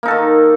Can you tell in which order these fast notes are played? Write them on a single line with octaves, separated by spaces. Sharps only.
A#3 D#4 A4 D#3